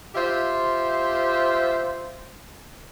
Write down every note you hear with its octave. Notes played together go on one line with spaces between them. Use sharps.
F4 G4 C5 E5